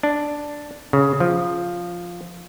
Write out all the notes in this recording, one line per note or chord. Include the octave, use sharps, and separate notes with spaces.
D4
C#3
F3